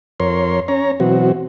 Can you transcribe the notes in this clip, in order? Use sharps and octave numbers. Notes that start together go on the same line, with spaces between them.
F2 A#4 C#5 C6
C#4 C#5 A#5
B2 E3 F#3 C4 F#4